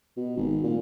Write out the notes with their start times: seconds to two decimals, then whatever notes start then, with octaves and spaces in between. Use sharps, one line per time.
0.17 B2
0.37 G#1
0.64 A#2